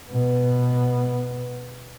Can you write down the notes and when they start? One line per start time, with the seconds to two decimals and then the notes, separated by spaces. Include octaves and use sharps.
0.11 B2 B3